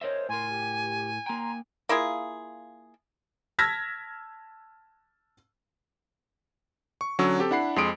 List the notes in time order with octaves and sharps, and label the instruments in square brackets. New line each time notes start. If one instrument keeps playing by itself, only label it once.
[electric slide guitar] A#4 D#5 E5 [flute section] C5 C#5
[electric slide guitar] A2 A#4 [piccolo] G#5 [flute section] C6
[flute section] G4
[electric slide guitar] A#3 G5 [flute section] A#5 C6
[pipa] A#3 E4 F4 G#4
[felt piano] A5 E6 F6 G#6 A#6 B6
[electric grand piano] C#6
D3 F#3 C#4 C#5 C#6 E6
C4 G4 A4
D4 E4 F#5 B5 C7
F2 G#3 C6 D#6 D7